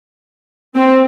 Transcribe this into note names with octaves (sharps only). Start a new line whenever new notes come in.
C4